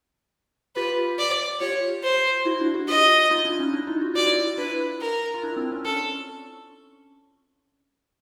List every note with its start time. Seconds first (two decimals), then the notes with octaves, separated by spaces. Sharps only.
0.76 F4 G4 B4
1.19 D5
1.60 F4 G4 C#5
2.03 C5
2.45 E4 F#4
2.60 D4 E4
2.74 E4 F#4
2.88 F4 G4 D#5
3.30 D#4 F4
3.45 D4 E4
3.59 C#4 D#4
3.73 D4 E4
3.87 D#4 F4
4.01 F#4
4.14 F4 D5
4.26 E4 F#4
4.46 F4
4.58 D4 E4 B4
5.01 A#4
5.34 F4
5.43 D4 E4
5.56 C4 D4
5.72 C#4
5.85 C#4 A4